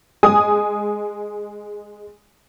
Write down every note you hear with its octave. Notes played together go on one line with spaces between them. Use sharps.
G#3 G#5 D#6